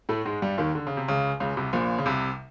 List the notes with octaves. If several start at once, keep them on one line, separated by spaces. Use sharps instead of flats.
A2 A3
G#2 G#3
G2 G3
D#2 D#3
D3
C#3
C3
C#2 C#3
C#2 C#3
C2 C3
A#1 A#2
C#3
C2 C3